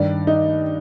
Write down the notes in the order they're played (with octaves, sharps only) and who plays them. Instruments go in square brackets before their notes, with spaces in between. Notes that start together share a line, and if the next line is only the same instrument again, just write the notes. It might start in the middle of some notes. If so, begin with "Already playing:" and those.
Already playing: [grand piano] G2 D#3 D5
D#4